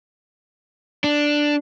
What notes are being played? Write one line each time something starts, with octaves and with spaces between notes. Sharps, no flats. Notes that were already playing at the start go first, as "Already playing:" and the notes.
D4